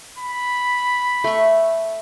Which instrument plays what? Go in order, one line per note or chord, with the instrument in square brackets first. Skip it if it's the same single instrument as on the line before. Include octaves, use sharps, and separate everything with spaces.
[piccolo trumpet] B5
[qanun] A3 C#6